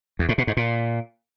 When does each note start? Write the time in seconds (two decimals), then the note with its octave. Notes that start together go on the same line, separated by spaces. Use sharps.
0.19 E2
0.29 A2
0.38 B2
0.47 G#2
0.57 A#2